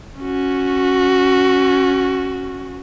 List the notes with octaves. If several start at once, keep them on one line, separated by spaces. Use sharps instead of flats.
C#4 F#4